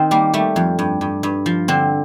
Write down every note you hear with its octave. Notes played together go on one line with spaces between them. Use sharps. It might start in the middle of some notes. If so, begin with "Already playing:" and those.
Already playing: D#3 C4
G3 A#3
G3 A3
F2
G2
G2
G2
F3
D3 C4